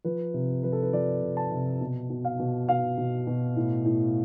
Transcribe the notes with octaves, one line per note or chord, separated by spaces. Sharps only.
F3 B4
C3
F3 B4
A4
B4
F3 D5
C3
A5
C3
B2
B2
F5
B2
B2 F5
B2
B2
A2
A2